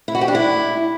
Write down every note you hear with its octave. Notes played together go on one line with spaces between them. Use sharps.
E4
F#4
G4
D4
E4